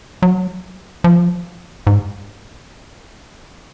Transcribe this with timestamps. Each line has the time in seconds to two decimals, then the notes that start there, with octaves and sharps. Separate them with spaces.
0.22 F#3
1.04 F3
1.87 G#2